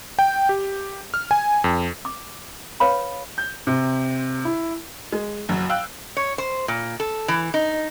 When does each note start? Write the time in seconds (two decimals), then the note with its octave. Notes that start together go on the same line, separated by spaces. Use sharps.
0.19 G5
0.49 G4
1.14 F6
1.31 G#5
1.64 F2
2.05 D6
2.80 B4 C#5 F5 B5
3.38 G6
3.67 C3
4.45 E4
5.12 G#3
5.49 F#1 F#2 F#3
5.69 F5 G5 E6 F#6
6.17 C#5
6.38 C5
6.68 A#2
7.00 A4
7.28 E3
7.54 D#4